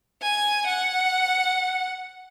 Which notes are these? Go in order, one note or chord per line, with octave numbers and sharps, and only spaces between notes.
G#5
F#5